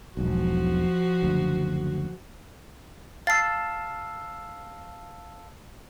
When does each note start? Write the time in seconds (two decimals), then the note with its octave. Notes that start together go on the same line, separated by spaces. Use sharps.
0.17 E1 B1 F3 F#4
1.22 F#1 D2
3.27 F5 A5 E6 A6 C7